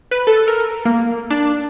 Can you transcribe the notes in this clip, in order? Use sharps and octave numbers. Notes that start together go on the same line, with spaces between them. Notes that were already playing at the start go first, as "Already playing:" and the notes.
B4
A4
A#4
A#3
D4